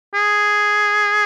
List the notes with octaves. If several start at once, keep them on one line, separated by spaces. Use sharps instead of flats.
G#4